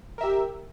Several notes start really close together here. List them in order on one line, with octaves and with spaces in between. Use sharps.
A#4 E5 G4